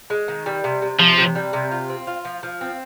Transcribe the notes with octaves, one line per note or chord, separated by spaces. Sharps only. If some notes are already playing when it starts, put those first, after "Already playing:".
G#3
D#3
G3
C3
C3
C3 F3
C3
G3
C3
F4
C4
F4
F3
F3
C4